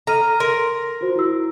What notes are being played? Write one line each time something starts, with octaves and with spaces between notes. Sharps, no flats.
A4 A#5 F6 D#7
A#4 C6
F4 F#4 C5
E4 E6